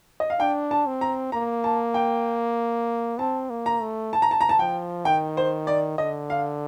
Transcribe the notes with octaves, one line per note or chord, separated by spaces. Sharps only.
D#5
F5
D4 G5
A5
C4
A#5
A#3 A#5
A5
G5
C4 A5
A#3
A#5
A3
A5
A#5
A5
A#5
A5
F3 G5
D#3 G5
C5
D5
D3 D#5
F5